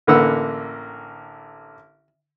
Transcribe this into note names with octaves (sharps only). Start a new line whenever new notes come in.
A1 D3 A#3 B4 F#5 E6